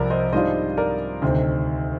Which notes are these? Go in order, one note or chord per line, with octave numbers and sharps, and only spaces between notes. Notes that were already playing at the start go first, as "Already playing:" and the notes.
Already playing: C2 C3 F3 A#4 D5
C5 D#5
G#2 G3 D4 F4 C5 D#5
A#4 D5
D2 C3 D#3 C5